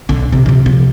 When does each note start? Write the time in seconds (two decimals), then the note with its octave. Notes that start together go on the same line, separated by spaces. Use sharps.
0.09 B1 D3
0.32 C3
0.46 C3 F3
0.66 C3 F3